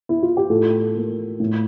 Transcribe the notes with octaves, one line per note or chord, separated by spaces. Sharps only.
E4
F4
G4
A2 F4 A4
A#3
A2